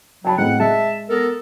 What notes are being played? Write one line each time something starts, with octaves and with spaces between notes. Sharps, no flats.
F#3 G5 A5 B5
A2 G#3 C4 F#5
G#3 E5 A5
B3 A4 A#4